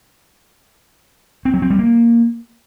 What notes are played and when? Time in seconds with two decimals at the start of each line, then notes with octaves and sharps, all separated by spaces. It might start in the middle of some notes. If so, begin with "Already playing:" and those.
1.45 C4
1.54 F#3
1.62 C4
1.70 G3
1.79 A#3